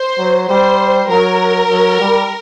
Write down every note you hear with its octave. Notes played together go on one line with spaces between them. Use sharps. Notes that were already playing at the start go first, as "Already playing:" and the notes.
Already playing: C5
F#3
G3 C5
F#3 A#4
F#3
G3